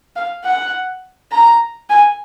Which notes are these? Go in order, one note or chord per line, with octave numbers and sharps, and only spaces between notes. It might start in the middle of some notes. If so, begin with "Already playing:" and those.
F5
F#5
A#5
G#5